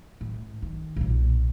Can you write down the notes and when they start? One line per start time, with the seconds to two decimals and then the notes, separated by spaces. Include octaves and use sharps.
0.21 A2
0.62 D#3
0.96 B1 A#2